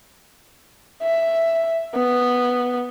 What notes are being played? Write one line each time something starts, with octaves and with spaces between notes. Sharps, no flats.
E5
B3